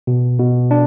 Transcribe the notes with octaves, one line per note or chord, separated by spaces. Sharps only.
B2
B2
D4